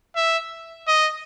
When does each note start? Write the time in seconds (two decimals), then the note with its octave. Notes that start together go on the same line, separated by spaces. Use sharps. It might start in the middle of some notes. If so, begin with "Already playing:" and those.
0.16 E5
0.88 D#5